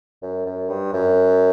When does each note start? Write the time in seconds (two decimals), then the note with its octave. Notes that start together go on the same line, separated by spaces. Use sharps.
0.23 F#2
0.46 F#2
0.69 G2
0.93 F#2